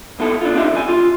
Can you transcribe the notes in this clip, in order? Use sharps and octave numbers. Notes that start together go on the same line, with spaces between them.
B1 B2 E4 A4
D4 F4
C4 D4 D#4 G4 E5
E2 G#5
F4